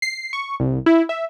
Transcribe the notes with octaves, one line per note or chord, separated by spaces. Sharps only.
C7
C#6
C2
E4
E5